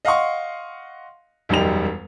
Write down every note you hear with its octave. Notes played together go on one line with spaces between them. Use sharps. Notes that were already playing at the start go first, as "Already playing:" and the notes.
D#5 F5 F#5 C6 C#6
E1 F#2 G3 D#4 G5 F7